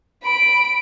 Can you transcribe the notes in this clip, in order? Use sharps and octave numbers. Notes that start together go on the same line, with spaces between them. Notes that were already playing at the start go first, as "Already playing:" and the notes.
B5 D7